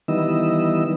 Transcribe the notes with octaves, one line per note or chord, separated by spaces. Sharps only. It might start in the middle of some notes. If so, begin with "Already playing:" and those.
D#3 E3 G3 B3 D#5 E6